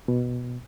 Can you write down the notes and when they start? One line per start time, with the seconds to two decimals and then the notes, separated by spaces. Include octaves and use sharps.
0.08 B2